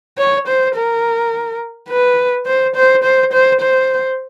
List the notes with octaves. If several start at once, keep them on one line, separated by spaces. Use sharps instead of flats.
C#5
C5
A#4
B4
C5
C5
C5
C5
C5